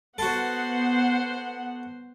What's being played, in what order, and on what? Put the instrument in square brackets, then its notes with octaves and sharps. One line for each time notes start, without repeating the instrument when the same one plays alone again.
[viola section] B3 F#5 [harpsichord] F#4 A4 [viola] C5